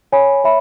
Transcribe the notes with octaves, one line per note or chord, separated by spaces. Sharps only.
C#5 G#5 B5
C#5 E5 B5